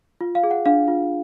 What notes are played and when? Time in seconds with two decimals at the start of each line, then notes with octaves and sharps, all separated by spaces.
0.21 F4
0.35 F5
0.43 G#4
0.51 F#5
0.66 D4 F5
0.88 F4